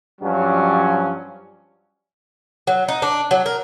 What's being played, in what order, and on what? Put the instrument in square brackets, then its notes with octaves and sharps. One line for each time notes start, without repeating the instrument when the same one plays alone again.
[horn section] G2 F3 F#3 C#4
[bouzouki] F#3
D#4
D4
F#3
A#4